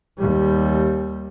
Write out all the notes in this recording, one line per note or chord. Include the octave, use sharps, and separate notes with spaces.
D#2 G3